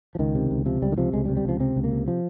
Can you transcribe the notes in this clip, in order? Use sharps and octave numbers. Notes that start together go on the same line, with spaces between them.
F3
C#2 D#3
C3
C#2
C3 F3
C#2 G3
D#3
C3 F3
C#2 G#3
G3
C3
G3
C#2 F3
C3 C4
C#2
A#3
C3
F3